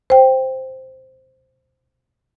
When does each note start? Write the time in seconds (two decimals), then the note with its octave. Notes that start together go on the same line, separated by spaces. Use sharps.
0.10 C5 G5